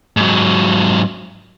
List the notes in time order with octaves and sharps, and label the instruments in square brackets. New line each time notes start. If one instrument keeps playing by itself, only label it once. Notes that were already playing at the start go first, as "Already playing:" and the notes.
[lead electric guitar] G#2 F#3